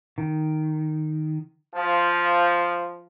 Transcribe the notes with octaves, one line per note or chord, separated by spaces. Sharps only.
D#3
F3